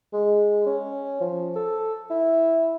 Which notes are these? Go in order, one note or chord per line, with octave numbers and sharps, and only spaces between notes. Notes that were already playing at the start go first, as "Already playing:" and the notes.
G#3
C#4
F3
A4
E4